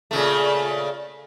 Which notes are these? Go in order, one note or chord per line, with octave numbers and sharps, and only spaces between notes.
A#2 C#3 A3